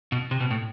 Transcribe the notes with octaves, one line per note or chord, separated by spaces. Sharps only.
B2
C3
B2
A2